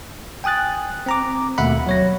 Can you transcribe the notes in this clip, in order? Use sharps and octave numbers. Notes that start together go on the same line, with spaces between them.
G5 G#5 D#6 F#6 A6
C4 A#5 D6
D#2 B2 A3 E5 F#5 B5
F#3 C#5 A#6